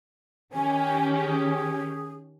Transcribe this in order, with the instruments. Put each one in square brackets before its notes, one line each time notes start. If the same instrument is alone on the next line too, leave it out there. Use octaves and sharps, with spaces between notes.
[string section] D#3 C#4 G4 [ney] G#5
[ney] G#4